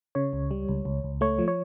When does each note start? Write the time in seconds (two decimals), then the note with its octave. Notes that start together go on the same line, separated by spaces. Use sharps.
0.15 C#3 C#5
0.33 C#2
0.51 G3
0.69 C#2
0.85 C#2
1.04 C#2
1.21 A3 C#5
1.39 F3
1.48 C#5